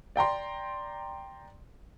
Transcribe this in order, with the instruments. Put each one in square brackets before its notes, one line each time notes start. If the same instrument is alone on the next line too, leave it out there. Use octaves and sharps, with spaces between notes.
[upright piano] D5 G5 A#5 C6